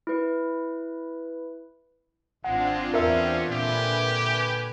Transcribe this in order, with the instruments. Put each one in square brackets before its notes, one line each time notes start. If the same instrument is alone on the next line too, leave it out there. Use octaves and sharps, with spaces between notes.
[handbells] E4 B4
[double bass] G#1 [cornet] G#3 [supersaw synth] C4 D4 F4 [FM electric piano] F#5
[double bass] E2 [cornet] C#4 [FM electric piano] A#4 E5
[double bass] A#2 D3 [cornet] G4 [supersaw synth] B4 G#5